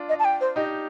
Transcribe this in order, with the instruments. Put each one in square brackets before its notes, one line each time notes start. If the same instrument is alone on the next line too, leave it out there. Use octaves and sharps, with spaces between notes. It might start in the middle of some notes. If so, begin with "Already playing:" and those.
Already playing: [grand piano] D4 F4
[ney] D#5
A5
G5
C5
[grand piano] D#4 G4 [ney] D#5